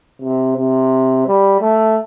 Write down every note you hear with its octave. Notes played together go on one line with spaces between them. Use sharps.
C3
C3
G3
A3